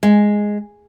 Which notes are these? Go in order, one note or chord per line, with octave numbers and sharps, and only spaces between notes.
G#3